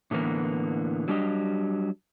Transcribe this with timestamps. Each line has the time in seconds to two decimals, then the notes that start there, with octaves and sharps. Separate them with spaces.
0.11 A2 D3 E3 A#3 B3
1.08 F#3 G3 D4 G4 D#5